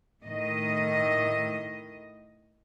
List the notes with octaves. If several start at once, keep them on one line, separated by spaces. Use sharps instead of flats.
A2 D#3 D#5